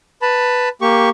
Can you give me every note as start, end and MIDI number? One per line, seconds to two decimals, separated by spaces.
0.22 0.69 71
0.22 0.69 81
0.22 0.69 83
0.82 1.09 58
0.82 1.09 67
0.82 1.09 85